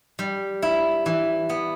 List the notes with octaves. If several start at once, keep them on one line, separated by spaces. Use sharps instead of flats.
G3
E4
E3
B3